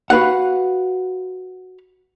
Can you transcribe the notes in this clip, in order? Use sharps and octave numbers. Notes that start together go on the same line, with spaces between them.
F#4 B4 F5 F#5